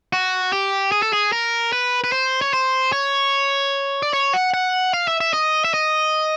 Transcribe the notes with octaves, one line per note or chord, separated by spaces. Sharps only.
F#4
G4
G#4
A4
G#4
A#4
B4
B4
C5
C#5
C5
C#5
D5
C#5
F#5
F#5
F5
E5
E5
D#5
E5
D#5